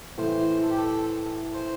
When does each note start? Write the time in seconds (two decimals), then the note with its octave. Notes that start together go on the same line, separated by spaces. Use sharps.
0.18 A2 E3 A3 C5
0.63 A4
0.70 G4
0.78 A4
1.54 C5